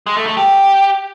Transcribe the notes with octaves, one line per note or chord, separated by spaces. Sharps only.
G#3
A3
A3
G4